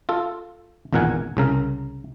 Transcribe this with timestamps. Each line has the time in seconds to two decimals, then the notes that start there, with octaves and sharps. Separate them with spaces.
0.09 F4 A4
0.93 G#1 E2 A#2 A#4 F#5 G#5
1.37 C2 C#3 A#4